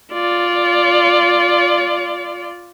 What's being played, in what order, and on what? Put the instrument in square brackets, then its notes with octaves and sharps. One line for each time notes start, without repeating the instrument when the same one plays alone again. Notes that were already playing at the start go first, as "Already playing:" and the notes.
[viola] F4 D5